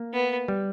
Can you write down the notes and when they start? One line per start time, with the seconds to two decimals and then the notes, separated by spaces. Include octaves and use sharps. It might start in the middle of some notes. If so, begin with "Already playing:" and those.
Already playing: A#3
0.13 B3
0.48 G3